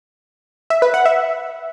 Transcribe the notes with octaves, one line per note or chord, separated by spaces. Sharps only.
E5
B4
F#5
E5